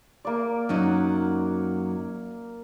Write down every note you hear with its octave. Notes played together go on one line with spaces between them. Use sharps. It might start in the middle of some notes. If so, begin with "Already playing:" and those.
A#3 D5
F#2 F#3 D#4